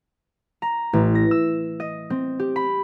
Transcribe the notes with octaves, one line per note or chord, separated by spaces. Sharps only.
A#5
A1
A#6
E6
D#5
C4
G4
B5